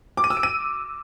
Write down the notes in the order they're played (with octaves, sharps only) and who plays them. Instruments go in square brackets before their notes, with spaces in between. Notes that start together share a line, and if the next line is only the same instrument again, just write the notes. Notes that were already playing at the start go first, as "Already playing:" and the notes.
[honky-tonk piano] D6
D#7
E6
D7
D#7